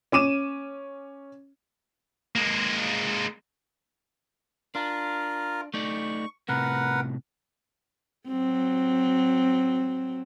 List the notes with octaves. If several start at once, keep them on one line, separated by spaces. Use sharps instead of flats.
C#4 D6 D#7 E7
G#3 A#3
D4 F4 A#4
A3 D#4 D5 C#6
A2 C3 A#4 B4 F#5
F#3 C4